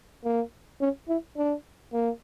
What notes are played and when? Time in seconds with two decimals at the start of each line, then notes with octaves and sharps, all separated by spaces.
0.24 A#3
0.81 C#4
1.08 E4
1.37 D4
1.93 A#3